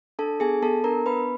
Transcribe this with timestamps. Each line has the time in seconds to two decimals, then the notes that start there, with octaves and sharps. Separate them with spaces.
0.19 D4 A4 A5
0.40 B3 G#4 G#5
0.62 B3 A4 A5
0.84 D4 A#4 A#5
1.06 B3 B4 B5